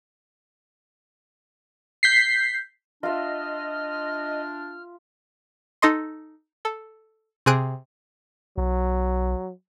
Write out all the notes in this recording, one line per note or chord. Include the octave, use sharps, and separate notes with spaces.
G6 B6 C7
D4 F4 D#5 E5 F6
D#4 A4 D#5 C6
A4
C3 C4 G#4 D#6 F#6 D7
B1 F#3